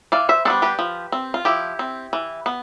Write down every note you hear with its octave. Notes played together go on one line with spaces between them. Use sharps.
E3 D5 F5
C5 E5
G3 B3 D4 A4 C5
G4 B4
F3
C4
F4
F3 E4 G4
C4
E3
B3